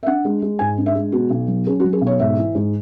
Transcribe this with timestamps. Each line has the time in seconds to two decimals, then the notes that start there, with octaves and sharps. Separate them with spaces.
0.03 E5
0.06 D4 F#5
0.25 G#3
0.42 G#3
0.59 G#2 G#5
0.78 D4
0.86 E5
0.95 G#3
1.12 B2 F#4
1.30 B1
1.48 F#3
1.66 C#4 G#4
1.80 F#4
1.84 F#3
1.93 G#4
2.01 B1
2.07 C#5
2.20 G#2 E5
2.38 E3
2.55 G#2